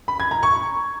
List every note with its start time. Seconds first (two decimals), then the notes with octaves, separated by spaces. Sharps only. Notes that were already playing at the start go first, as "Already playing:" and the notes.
0.08 B5
0.20 G#6
0.31 A#5
0.43 C#6